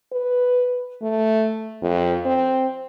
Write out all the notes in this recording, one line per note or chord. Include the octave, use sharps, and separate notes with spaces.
B4
A3
F2
C4